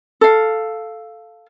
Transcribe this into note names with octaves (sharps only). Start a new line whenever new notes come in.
A4 F5